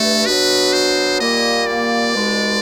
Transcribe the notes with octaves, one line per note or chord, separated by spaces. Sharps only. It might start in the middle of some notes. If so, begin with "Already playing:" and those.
Already playing: G2 E3 A3 A4
B2 F#3 B3 D4 F#4 B4
C5
A#2 G3 A#3 D#5
D5
C2 B2 G#3